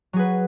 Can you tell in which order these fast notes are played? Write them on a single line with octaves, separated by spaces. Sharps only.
F#3 G#4 B4